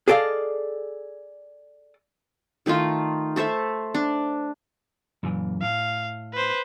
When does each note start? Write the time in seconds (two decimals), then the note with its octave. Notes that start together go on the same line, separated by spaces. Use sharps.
0.08 G#4 A4 D5 D#5 F5
2.66 D#3 A3 D#4 F4
3.36 A3 A4 C5 E5
3.94 D4
5.23 F#2 A#2 E3
5.62 A2 F5
6.33 B4 C5